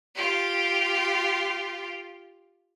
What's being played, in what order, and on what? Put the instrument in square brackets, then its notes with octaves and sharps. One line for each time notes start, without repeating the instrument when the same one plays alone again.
[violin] F4 G4